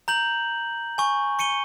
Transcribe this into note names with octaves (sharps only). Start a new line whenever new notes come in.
A#5 G6 F#7
G#5 C#6
C#6 C#7 D#7 G7